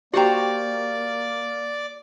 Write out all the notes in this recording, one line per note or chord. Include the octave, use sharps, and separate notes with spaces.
A#3 F#4 G4 C5 D5 G5 A#5